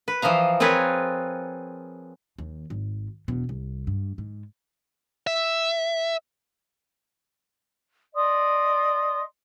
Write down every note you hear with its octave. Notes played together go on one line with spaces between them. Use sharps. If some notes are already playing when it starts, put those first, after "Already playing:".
B4
E3 F3 D#5 F5 A#5
C4 F4 G#4 A#4 B4 C#5
D#2
G#1
E1 B2
C2
G2
G#2
E5
D5 D#5 C6 D#6